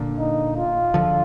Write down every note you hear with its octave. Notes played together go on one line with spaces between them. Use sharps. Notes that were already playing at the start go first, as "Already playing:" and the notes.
Already playing: A#2 D3
D#4
F4
D3 F3